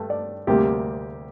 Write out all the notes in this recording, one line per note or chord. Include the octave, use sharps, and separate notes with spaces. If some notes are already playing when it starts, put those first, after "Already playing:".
Already playing: G2 A3
D5
D2 C3 G3 A#3 G4